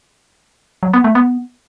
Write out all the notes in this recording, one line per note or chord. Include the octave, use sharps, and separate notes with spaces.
F#3
B3
A3
B3